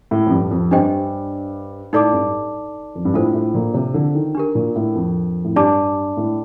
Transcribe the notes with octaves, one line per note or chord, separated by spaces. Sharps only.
A2
F2
G2
F2
G2 D4 G4 C5 D#5 G5
A2 D#4 A4 D5 A5 D6
G2
F2
G2
A2 D4 F4 A4 C5
A2
A#2
C3
D3
D#3
D4 G4 A#4
A#2
A2
F2
A2
G2 D4 G4 D5 A5 D6
A2